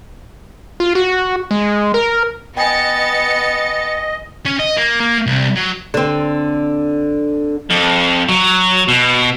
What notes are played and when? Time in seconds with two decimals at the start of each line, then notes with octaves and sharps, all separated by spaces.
0.80 F4
0.95 F#4
1.51 G#3
1.94 A#4
2.57 B3 D#5 G5 G#5 A6 C#7
4.46 C#4
4.60 D#5
4.77 A#3
5.01 A#3
5.27 C2
5.56 F#3
5.94 D3 C4
7.70 F2
8.29 F#3
8.88 B2